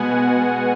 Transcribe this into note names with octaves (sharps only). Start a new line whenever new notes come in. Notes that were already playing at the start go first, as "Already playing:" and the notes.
Already playing: B2 G#3 B3 F#5 G#5